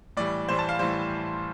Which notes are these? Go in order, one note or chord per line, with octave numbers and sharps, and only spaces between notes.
A2 E3 G3 D5
A2 E3 G3 C5
A5
F5
A2 E3 G3 C5